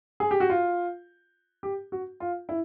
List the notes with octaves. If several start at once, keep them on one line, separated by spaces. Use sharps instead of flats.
G#4
G4
F#4
F4
G4
F#4
F4
E4